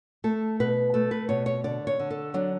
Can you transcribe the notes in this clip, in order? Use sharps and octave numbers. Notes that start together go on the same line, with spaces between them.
A3 A4
B2 B4
A3 A4
B4
B2 C#5
C#5
D3 D5
C#5
D3
A4
F#3 D4